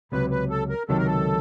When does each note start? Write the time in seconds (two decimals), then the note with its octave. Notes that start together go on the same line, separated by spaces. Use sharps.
0.12 C#2 C3 D#3 F#3 B4
0.31 B4
0.50 A4
0.70 A#4
0.89 C#2 C3 D#3 F#3 A4
0.98 A#4
1.06 A4